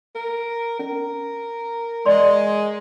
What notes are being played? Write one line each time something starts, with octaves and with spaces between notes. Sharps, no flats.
A#4
C#4 A#4
G#3 D5 C6